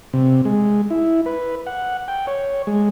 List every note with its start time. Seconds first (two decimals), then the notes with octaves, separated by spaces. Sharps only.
0.13 C3
0.45 G#3
0.90 E4
1.26 B4
1.67 F#5
2.08 G5
2.27 C#5
2.67 G#3